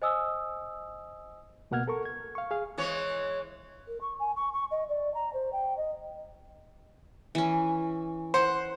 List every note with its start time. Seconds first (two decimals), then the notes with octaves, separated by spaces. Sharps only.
0.02 C5 D#5 G#5 D#6 E6
1.71 C#2 B2 A#3 F#5 F6 G#6
1.88 A4 A#4 C#6
2.05 G#6
2.35 F5 C#6
2.51 G#4 F5
2.78 E3 G#3 C#5
3.87 A#4
4.01 C#6
4.19 G#5
4.36 C#6
4.53 C#6
4.71 D#5
4.88 D5
5.14 A#5
5.33 C5
5.52 G5
5.77 D#5
7.35 E3 C#4
8.34 C5 F#5